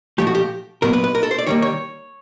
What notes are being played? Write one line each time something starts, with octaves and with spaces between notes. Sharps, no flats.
A#2 F3 A3 G4
F#4
G4
A#2 F#3 B3 A#4
B4
B4
A#4
A4
C5
D5
D#3 G3 A#3 C#5
C#5